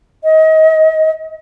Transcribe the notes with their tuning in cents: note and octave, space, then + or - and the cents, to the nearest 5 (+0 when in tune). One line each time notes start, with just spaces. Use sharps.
D#5 +30